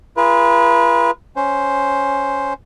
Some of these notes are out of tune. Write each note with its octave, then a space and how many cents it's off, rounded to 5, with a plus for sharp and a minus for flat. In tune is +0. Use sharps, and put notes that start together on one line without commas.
F4 -45 G#4 +0 B4 -35
C#4 +0 C5 +0